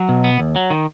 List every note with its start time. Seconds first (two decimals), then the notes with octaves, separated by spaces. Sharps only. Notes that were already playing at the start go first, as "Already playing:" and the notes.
Already playing: F#3
0.09 B2
0.24 B3
0.39 D#2
0.56 F#3
0.70 D#3